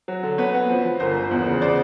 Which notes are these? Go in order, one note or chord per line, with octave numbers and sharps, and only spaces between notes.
F#3
D3
B3 B4 C#5
B3
F3
F3
G1 A#4 C5
F3
E2
C#3
C5 D5